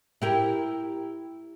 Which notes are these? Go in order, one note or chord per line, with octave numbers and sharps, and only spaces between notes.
E4 G4 A#4